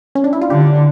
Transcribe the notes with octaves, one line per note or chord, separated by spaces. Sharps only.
C#4
D4
E4
F4
D3 G4